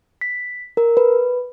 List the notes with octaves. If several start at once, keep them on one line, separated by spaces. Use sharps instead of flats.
B6
A#4
B4